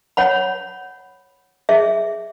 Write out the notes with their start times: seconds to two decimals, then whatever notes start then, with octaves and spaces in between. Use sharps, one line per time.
0.17 C#5 F#5 B5
1.69 G#4 E5